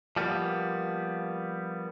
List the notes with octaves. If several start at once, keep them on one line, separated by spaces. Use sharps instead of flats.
F3 G3 A#3 B3